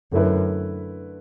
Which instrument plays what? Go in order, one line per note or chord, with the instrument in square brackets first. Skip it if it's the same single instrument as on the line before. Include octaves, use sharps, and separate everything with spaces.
[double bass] F#2 [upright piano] D3 A3 E4 B4